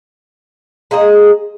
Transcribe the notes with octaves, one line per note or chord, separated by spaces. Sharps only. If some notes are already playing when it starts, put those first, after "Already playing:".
G#3 A#3 G#4 D#5